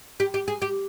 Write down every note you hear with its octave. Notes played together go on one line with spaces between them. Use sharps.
G4
G4
G#4
G4